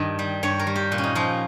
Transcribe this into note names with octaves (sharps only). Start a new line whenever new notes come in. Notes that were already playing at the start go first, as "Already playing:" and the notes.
Already playing: G2 D#3 D#5
G3
G2 C#5
A#4
G3
G4
A#2
C#4
D#4
F3 D#4